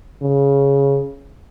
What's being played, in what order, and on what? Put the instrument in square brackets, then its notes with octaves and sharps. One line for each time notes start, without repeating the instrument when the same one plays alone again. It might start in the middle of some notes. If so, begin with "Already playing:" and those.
[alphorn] C#3